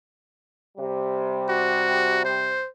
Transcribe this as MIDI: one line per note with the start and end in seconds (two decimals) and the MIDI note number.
0.77 2.58 48
0.77 2.58 55
1.49 2.23 66
2.25 2.67 72